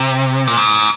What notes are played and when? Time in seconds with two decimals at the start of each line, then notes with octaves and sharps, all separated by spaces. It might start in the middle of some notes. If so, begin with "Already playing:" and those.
Already playing: C3
0.47 A#2
0.57 G#2